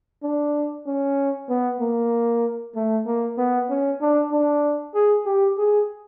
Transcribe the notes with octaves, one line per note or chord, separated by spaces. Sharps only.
D4
C#4
B3
A#3
A3
A#3
B3
C#4
D4
D4
G#4
G4
G#4